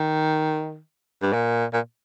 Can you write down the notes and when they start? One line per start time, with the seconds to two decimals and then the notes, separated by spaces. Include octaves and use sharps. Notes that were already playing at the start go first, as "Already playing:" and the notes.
Already playing: D#3
1.22 G2
1.33 A#2
1.73 A#2